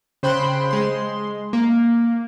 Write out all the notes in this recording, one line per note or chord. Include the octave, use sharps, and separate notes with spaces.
C#3 C5 G5 B5 C6 F#6
G#3 C6
A#3